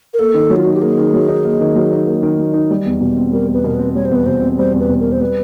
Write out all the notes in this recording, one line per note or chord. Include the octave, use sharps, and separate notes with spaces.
A#4
A#3 A4
D#3
F#3
F4
D#4 F#4
G4
A#3 G#4
D#3
F#3
D#4
A#3
D#3
F#3
D#4
A#3
D#3
F#3
D#4
G3
E2
B2
C4
G3 A#4
E2 B4
B2 A#4
C4 B4
G3 C#5
C5
E2 B4
B2 C5
C4
G3 C5
E2
B4
B2
C4 A#4
C5
G3 B4